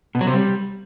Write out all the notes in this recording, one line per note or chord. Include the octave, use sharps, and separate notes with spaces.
B2
F#3
C3
G3